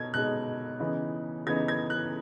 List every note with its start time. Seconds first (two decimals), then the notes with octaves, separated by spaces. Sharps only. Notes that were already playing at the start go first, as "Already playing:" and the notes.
Already playing: B2 D#4 G#6
0.14 B2 G#3 D#4 F#6
0.80 C#3 E3 B3 D#4
1.46 C#3 E3 B3 D#4 G#6
1.68 G#6
1.90 F#6